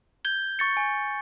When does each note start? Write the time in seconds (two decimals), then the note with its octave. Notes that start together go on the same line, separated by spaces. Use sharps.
0.25 G6 G#6 G7
0.59 C#6 A6 C#7
0.77 G#5